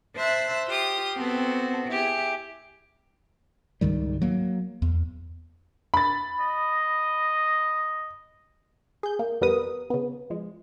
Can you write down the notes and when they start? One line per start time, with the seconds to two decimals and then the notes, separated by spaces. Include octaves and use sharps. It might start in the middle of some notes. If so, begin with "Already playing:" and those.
0.16 C5 E5 A5 E6 F#6
0.69 F4 G4 D#6
1.16 B3 C4 F#4 A4
1.88 E4 G4 G#4
3.81 C#2 G#2 D#3 G3
4.22 F#3 A#3
4.82 E2
5.94 B5 A6
6.40 D#5
9.03 G#4 G6
9.19 A#3
9.41 F2 G3 B3 A#4 B4 D#6
9.90 C#3 B3
10.30 F3 G#3